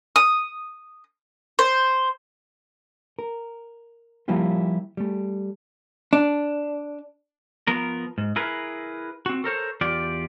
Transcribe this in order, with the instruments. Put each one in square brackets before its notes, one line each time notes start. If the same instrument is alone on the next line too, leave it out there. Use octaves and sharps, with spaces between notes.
[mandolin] D#6
C5
[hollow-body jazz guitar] A#4
F3 G3 A#3 E4 F4 G4
G3 A3
D4
[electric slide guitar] F3 B3 A#4
G#2
E4 G#4 A#4 B4
C4 F#4
A4 A#4 C5 C#5
E2 F4 G4 D5